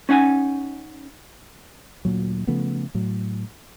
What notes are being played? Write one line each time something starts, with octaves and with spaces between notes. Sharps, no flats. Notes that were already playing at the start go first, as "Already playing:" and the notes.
C#4 D#4 F#5 G#5
D2 A#2 F#3
C#3 F3 A3 B3
A2 F#3